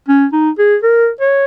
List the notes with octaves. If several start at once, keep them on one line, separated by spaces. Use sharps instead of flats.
C#4
D#4
G#4
A#4
C#5